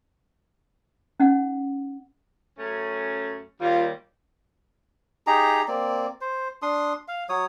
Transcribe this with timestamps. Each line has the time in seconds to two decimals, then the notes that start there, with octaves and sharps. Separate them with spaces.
1.20 C#4 D#4 F#5
2.58 F#2 A3 C#4
3.60 D#2 G3 F4
5.27 D#4 G4 G#4 A#5
5.68 A#3 C4 D5
6.21 C5
6.62 D4 C6 D#6
7.08 F5
7.29 F#3 C#5 D#6